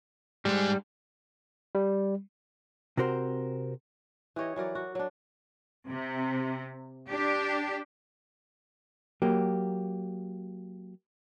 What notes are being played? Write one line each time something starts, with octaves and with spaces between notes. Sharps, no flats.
G#2 G3 G#3
G3
C3 C4 F#4 A#4 C5
E3 G4 C#5 D#5
E3 F#3 A#4 D5
F#4
F#3 D4
C3
D4 G4
F#3 A#3 G4